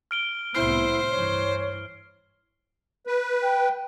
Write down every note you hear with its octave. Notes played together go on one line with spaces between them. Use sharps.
F6 D7 G7
C2 A2 B3 E4 C5 F6 C7
G2 E3 C#5
B4
G5